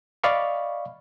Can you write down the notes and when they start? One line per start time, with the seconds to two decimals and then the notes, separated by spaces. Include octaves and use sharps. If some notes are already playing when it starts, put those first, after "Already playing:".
0.24 D5 D#5 F5 B5 C#6